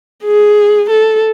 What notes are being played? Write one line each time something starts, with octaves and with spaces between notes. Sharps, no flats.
G#4
A4